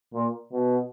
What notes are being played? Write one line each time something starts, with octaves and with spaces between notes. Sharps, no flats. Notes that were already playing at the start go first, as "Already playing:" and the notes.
A#2
B2